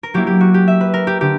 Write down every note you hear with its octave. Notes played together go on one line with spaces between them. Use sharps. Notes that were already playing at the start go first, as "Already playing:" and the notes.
A#4
F#3 A#3 E4 G4
G4
F#4
G4
E5
B4
A#4
G4
D3 G4